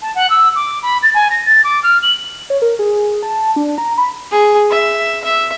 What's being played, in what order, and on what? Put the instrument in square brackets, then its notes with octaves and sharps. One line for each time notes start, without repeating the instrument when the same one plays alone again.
[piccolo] A5
F#5
E6
D6
B5
A6
G#5
A#6
A6
D6
F6
F#7
[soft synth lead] C#5
A#4
G#4
A5
D4
A#5
B5
[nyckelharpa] G#4
E5
E5